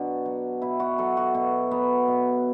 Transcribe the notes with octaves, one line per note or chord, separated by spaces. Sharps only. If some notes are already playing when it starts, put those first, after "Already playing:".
Already playing: B2 F#3 D4
F#3
B2 E4
F#4
F#3 A4
F#4
B2 F#4
F#3 B3
B2